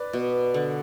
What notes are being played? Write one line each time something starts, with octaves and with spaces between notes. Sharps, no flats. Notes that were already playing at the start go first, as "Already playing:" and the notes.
Already playing: B4 D5
B2
D3